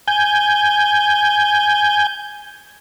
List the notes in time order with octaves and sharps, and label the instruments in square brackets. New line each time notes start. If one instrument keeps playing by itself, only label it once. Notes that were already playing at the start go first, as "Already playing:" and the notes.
[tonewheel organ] G#5 G6